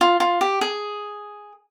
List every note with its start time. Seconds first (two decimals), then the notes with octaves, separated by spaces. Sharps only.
0.01 F4
0.20 F4
0.41 G4
0.61 G#4